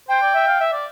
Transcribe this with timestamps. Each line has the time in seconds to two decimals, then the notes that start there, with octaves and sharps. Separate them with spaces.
0.08 C5 G5
0.21 D5
0.34 E5
0.47 F5
0.60 E5
0.73 D5